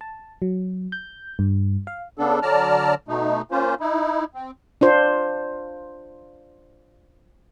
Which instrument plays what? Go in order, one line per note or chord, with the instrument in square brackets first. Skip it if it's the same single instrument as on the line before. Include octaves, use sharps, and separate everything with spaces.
[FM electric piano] A5
F#3
G6
G2
F5
[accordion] C#3 B3 D4 A4
D3 F#3 D5 A5 A#5 F6
B2 A3 D#4
A#3 C#4 F4 C5
D#4 E4
C4
[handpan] D4 F4 C5